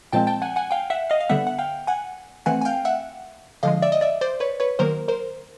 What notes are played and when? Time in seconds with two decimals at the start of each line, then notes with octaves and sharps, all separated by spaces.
0.13 A#2 F3 G#3 C4 G5 A5
0.27 G5 A5
0.42 F#5 G#5
0.56 F#5 G#5
0.71 F5 G5
0.90 E5 F#5
1.10 D#5 F5
1.20 F5
1.29 D3 G3 B3 E5 F#5
1.47 F#5
1.59 F5 G5
1.87 F#5 G#5
2.46 E3 A3 C4 F#5 G#5
2.61 G#5
2.65 F5 G5
2.85 E5 F#5
3.63 D3 F3 G#3 D#5 F5
3.82 D5 E5
3.92 D#5
4.01 D5 E5
4.21 C5 D5
4.40 B4 C#5
4.60 B4 C#5
4.79 D#3 F#3 A#3 A#4 C5
5.08 A#4 C5